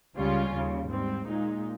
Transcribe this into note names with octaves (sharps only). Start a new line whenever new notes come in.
C#2 C#3 G3 C#4 F4
D#2 C#3 G3
G#2 G3 C4
A#2 G#3 D#4